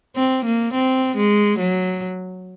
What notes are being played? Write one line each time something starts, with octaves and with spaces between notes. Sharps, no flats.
C4
A#3
C4
G#3
F#3